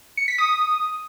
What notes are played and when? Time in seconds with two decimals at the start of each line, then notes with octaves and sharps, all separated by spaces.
0.17 C#7
0.28 B6
0.38 D#6